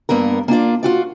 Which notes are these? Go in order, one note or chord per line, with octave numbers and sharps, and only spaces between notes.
G2 A#3 B3 A#4
A#3 D4 F4 D5
F4 F#4 D5